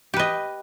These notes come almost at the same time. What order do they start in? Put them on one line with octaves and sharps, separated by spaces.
G4 B4 D#5